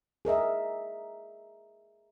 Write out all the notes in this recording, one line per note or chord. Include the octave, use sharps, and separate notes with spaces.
G#4 A#4 D#5 E5